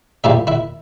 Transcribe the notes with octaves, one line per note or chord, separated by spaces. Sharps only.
A#2 G3 A#3 E4 E5
E4 E5